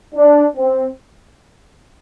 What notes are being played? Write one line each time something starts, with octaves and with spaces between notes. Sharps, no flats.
D4
C4